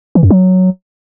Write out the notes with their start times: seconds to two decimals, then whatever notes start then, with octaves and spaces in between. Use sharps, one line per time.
0.15 E3
0.23 F#2
0.30 F#3